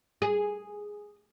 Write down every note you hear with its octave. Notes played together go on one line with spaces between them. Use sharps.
G#4